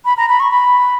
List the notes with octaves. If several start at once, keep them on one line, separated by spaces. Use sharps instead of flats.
B5
A#5
B5
C#6
B5